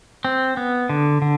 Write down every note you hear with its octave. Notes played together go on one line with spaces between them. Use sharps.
C4
B3
D3
D3